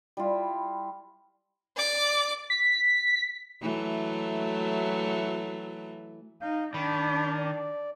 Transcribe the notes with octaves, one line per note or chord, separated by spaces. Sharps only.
G3 E4 F4
D5 D6
B6
E3 F#3 A3
D#4 F5 G6
D#3 D4 B5
D5